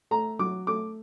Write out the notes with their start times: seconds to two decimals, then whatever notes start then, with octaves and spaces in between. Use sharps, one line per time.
0.11 A3 A#5
0.39 F#3 D6
0.67 A3 D6